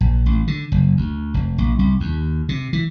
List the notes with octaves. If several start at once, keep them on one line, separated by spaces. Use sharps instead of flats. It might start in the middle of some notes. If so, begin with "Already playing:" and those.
A#1
A1
D3
F#1
D2
F1
A#1
C2
D#2
C3
E3